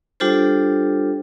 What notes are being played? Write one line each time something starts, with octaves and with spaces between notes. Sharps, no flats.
G3 D4 F4 G4 A4 C5